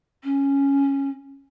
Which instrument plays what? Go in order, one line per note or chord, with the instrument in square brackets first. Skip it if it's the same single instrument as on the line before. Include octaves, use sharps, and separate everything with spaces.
[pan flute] C#4